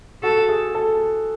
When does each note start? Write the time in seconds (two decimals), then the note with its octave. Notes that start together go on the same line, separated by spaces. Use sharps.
0.23 F#4 A4
0.49 G#4
0.75 A4